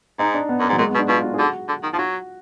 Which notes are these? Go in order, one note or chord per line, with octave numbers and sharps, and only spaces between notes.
G#2 D#4
D4
B3
F#2
G#2 F#3
A#2 G#3
B3
B2
D4
B2 F4
F#4
G#4
D3 F#4
D3
D#3
F3 F4
F#3 F#4